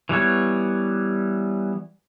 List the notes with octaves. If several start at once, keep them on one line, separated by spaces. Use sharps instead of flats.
E3 G3 B3 C#5